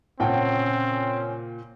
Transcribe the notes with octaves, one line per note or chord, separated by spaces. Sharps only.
A#2 C#3 C4 C#4 F#5 G5 A5